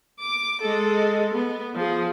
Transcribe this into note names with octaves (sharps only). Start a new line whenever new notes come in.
D6
G#3 A4
B3
F3 G#4